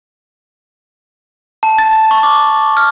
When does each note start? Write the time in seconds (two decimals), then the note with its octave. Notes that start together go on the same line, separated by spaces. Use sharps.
1.63 A5
1.78 A6
2.11 C#6
2.23 D6
2.77 F6